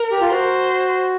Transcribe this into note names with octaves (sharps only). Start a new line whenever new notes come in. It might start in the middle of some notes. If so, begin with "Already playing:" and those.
Already playing: A#4
G4
F4
F#4 C5